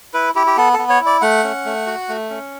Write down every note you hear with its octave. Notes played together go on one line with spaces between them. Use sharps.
E4 B4
E4 G4
G4
B3 A4
A4
B3
C#5
E4
D5
A3 F#5
C#4
A3
F#4
A3
C#4